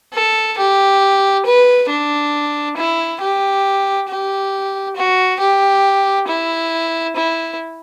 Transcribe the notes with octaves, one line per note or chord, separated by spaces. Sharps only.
A4
G4
B4
D4
E4
G4
G4
F#4
G4
E4
E4